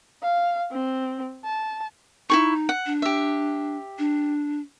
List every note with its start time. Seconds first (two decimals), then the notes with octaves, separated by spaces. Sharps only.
0.22 F5
0.72 C4
1.44 A5
2.30 D#4 E4 G#4 C#6
2.69 F#5
2.86 D4
3.02 G4 E5
3.98 D4